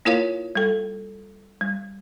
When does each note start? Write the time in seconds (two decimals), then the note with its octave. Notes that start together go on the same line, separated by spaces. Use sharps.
0.05 A#3 E4 F4 A#4 C#5 F5
0.55 G3 A4
1.61 G3